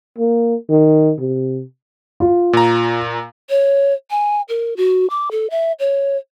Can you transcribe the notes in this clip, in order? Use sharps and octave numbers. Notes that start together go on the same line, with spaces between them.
A#3
D#3
C3
F4
A#2 A#5
C#5
G#5
A#4
F#4
D6
A4
E5
C#5